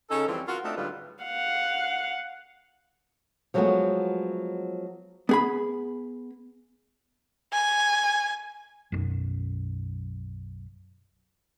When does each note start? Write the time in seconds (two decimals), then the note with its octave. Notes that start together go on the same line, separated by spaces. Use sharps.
0.10 C#3 C#4 D#4 A4
0.28 F2 E3 G3 C4 C#4 F4
0.48 F4 F#4 A#4
0.65 A3 C4 D4 D#4 F4 A4
0.77 G#2 D3 F#3 G3 F4 B4
1.24 F5 F#5
3.54 F3 F#3 G#3 A3 B3 F#4
5.29 B3 G#4 B5
7.53 G#5
8.92 B1 F#2